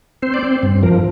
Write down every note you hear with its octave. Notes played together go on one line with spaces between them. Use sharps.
C4 C5
D5
C4 C5
G2
F3 A#4